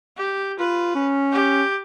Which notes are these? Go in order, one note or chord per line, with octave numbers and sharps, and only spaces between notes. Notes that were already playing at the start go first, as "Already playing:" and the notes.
G4
F4 B4
C#4
G4